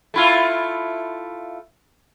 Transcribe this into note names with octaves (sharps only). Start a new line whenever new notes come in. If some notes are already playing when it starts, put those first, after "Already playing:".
A3 E4 F4